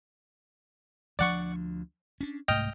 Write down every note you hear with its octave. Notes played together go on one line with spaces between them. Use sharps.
D2 F3 D4 D5 F#5 C#6
C#4 D4
C2 G#2 A3 D#5 G5 F6